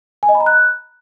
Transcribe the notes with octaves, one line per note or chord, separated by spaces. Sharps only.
G#5
D#5
B5
A#5
F#6